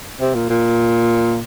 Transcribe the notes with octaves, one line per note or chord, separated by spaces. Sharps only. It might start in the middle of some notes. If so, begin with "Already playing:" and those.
C3
A#2
A#2